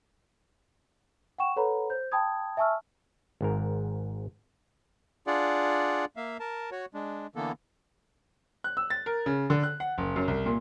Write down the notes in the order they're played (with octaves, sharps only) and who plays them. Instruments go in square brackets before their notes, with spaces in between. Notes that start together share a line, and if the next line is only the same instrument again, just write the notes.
[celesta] F#5 G5 C#6 E7
A4 B4 C#5 F#5 A#5 B5
C5 G6
G5 A5 B5 D#6 G#6
E5 G#5 A5 C#6 E6 F6
[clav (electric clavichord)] G#1 G#2 A#4
[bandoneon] D4 F4 G#4 D5 F#5
A#3 E5 F5
A#4 A5
F#4 C#5
G#3 D4
D3 E3 A#3 B3 A4
[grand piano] F#6
E6
A6
A#4
C#3
D3
F#6
F#5
F#1
F#2
C2
A#2